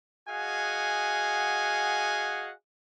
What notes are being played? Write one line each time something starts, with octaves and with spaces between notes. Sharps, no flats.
F#4 G#4 D#5 F5 F#5 G#5